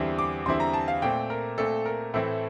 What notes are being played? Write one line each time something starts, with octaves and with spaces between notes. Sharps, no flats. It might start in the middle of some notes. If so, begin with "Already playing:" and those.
Already playing: E2 D3 G3 C4 E4
D6
E2 D3 G3 C4 E4 C6
A#5
A5
F5
A#2 A3 C4 G5
A#4
A#2 A3 C4 A4
A#4
A2 E3 A3 C4 E4 A4